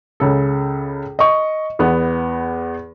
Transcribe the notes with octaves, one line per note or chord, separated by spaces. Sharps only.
C#2 C#3 A4
D#5 C#6
E2 B3